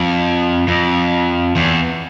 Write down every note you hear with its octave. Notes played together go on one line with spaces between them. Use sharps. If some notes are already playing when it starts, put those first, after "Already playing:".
Already playing: F2
F2
E2